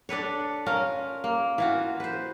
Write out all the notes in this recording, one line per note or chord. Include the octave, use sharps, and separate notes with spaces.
D4 A4 B4 C#5
C#4 F4 A#4
A#3
E3 F4 F#4
B4 C5